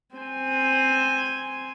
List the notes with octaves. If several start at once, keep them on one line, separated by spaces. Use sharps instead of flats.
C4 G#5